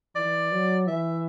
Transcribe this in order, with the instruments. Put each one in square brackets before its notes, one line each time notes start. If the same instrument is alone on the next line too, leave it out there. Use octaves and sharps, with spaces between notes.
[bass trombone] E3 [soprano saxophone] D5
[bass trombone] F#3
[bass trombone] E3 [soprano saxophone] E5